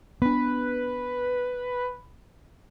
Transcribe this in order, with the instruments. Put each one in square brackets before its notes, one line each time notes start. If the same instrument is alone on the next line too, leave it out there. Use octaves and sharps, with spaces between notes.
[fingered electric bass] B3 D4 [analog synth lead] B4